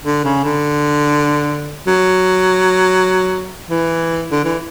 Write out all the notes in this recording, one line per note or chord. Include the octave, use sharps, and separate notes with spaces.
D3
C#3
D3
F#3
E3
D3
E3